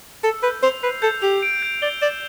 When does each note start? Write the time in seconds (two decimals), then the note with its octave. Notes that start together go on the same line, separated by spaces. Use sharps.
0.24 A4 E6
0.43 B4 G6
0.63 C5 F7
0.83 B4 C7
1.02 A4 G6
1.22 G4 F7
1.43 D7
1.63 G6
1.82 D5 G7
2.02 D5 E7